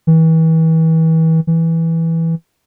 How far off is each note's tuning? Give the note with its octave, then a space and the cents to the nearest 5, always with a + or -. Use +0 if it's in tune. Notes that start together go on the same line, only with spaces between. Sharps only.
E3 -35
E3 -5